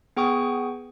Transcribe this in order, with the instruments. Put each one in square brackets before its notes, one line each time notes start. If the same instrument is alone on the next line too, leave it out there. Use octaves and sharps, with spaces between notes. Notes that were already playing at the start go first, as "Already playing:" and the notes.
[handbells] B3 G#4 G5 C#6 D#6